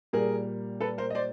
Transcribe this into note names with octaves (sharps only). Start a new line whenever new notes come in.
A#2 G3 A#3 G#4 A#4
A4 B4
A#4 C5
D#5
C5 D5